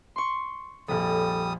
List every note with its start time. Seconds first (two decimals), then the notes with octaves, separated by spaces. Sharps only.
0.16 C6 C#6
0.88 A#1 F2 G3 A4 D#6